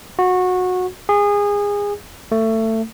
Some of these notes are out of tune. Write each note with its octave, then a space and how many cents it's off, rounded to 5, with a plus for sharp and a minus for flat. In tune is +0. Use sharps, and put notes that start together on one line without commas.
F#4 -20
G#4 -25
A3 +20